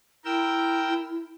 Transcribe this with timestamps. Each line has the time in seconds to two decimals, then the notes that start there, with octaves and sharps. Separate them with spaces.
0.25 E4 A#4 G5 E6